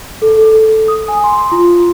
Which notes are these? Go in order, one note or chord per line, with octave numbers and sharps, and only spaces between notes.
A4
A4
D#6
G#5
C6
F4